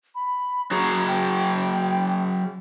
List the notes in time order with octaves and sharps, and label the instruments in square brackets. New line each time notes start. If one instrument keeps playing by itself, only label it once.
[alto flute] B5
[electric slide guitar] F#3 F#4 G#4 [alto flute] A#5
[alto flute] G5